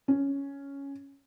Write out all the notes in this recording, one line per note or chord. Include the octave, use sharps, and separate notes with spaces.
C#4